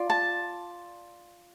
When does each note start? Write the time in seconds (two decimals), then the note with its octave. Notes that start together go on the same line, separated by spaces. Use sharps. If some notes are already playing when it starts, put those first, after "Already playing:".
Already playing: F4 D5
0.10 A5